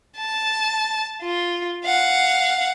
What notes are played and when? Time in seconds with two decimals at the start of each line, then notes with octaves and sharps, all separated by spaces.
0.17 A5
1.23 F4
1.85 F5 F#5